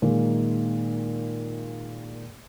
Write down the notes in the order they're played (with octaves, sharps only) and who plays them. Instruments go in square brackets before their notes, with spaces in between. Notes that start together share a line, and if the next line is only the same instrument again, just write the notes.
[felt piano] A#2 D#3 G#3 A#3